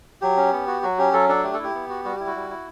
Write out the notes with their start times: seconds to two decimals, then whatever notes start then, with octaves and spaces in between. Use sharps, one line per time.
0.22 F#3 G4
0.37 C#4
0.53 B3
0.67 F#4
0.83 F#3 F#4
0.98 C#4 G4
1.13 F#3 A4
1.29 D4 A4
1.43 A3 G4
1.54 E4 A4
1.64 G4
1.75 B3
1.89 F#4
2.05 G3 F#4
2.16 E4 G4
2.27 F#4
2.35 G3
2.50 E4